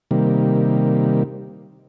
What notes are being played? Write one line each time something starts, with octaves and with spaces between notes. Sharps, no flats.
C3 D#3 G3 A#3